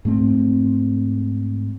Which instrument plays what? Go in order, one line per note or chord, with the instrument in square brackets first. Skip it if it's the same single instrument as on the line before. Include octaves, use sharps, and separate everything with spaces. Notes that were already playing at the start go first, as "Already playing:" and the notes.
[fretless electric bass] G#2 A3 C4